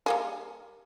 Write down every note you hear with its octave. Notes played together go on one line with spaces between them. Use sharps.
G3 A#3 G#4